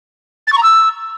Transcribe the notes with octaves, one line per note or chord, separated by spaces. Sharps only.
A6
C#6
A#5
E6